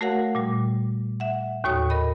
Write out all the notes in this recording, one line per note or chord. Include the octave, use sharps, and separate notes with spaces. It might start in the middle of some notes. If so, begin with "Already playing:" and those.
A3 F#4 A#4 C#5 F5 F#5
A#2 G3
E5 F#5
D#2 A2 F#4 C#5 D#6 G6
A#4 D#5 B5